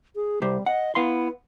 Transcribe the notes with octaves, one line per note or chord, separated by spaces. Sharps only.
G#4
C2 G3 G4 C5
D#5 F#5
B3 E4 F5 C6